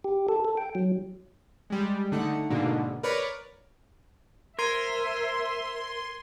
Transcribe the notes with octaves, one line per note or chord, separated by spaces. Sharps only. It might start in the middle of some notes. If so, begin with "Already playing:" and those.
G4
A4
A4
G5
F#3
G3 G#3
D3 A3 D#4 F#5
G#2 B2 D3 A#3
A#4 B4 C#5 D5 A#5 B5
A#4 C5 E5 C6 G#6 C7 D#7